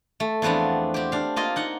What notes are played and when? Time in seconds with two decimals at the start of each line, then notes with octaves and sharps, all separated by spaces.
0.20 A3
0.42 E2 F3 B3 C4 D4
0.94 C4 G4
1.12 D4 F5
1.36 A#3 F4 D#5
1.56 D#4 F#5